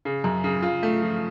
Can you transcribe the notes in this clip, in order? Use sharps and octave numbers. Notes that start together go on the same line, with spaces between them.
C#3
F#2
C#3
F4
A3
F3